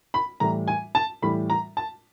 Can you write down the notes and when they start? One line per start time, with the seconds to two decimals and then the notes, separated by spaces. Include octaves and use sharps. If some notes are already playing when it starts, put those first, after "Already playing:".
0.14 B5
0.40 A2 E3 G3 A#5
0.68 G#5
0.95 A5
1.22 A2 E3 G3 B5
1.50 A#5
1.77 A5